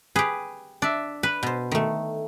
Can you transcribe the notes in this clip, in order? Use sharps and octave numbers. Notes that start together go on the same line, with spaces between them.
G4 G#4 B4
D4 D5 E5
B4 B5
B2 C5
D#3 A3